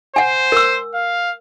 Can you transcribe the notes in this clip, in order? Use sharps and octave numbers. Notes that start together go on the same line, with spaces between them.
C5 F#5 G#5
A#4 E6
F5